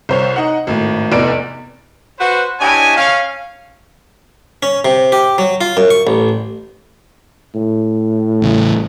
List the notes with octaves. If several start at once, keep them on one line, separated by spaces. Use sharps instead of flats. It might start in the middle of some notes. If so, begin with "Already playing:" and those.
C2 C5 C#5
D#4 F#5
G#1 A2
F1 E2 D5 D7
F#4 B4 C5
D4 E4 G4 C#5 D#5 G#5
C#4 F5
C#4
C3
G4
F#3
F4
F#2
C#6
A1
A2
A1 C#3